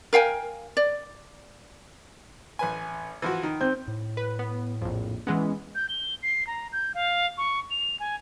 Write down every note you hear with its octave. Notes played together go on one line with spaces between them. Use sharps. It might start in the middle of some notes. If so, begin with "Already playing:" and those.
A#4 F5 G5 G#5
D5
A1 B4 G#5
E3 F3 F#4
D#3
C4 G6
A2
B4
B3
A#1 F2
E3 G#3 B3 C#4
G6
G7
C7
A#5
G6
F5
C#6
F7
G#5